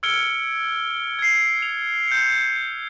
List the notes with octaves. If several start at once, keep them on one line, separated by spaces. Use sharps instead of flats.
E6 F6 G#6 C#7 D7 G7
G#6 C7
F7
G6 C#7